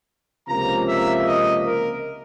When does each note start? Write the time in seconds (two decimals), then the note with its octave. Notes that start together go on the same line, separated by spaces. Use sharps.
0.48 C#2 C3 F3 A#3 A#5
0.87 E5
1.26 D#5
1.65 A#4